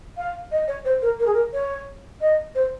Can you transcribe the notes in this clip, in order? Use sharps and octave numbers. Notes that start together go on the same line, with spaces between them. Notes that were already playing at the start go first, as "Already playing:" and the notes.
F5
D#5
C#5
C5
A#4
A#4
G#4
A#4
C#5
D#5
C5